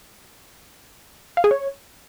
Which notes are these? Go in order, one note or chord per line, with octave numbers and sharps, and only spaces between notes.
F5
G#4
C#5